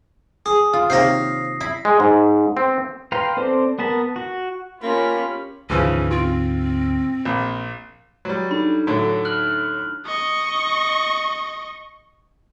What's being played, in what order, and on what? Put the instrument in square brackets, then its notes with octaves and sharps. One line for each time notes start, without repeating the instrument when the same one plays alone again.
[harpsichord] G#4 [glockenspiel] D#6
[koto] F4
[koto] C3 D#3 A#3 [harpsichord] C5 C#5 F5 [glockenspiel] A#6 C7
[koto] E4 [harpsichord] B5
[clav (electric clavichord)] G#3
G#2
C4
[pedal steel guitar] B4 F5 G5 A#5 C6
C4 A4 C5 D5
B3 A#4 A5 B5
F#4
[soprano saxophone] A#3 [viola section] C#4 F4 G4 [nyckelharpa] B5
[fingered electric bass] D2 G#2 [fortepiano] C#3 E3 F3 [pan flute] C#4
[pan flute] C4 [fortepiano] F4
[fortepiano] A#1
F#3 G3
[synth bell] D4 D#4 A4 [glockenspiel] B5
[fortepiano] A2 D3 F#3
[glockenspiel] F6 F#6 F#7
[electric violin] D#5 C#6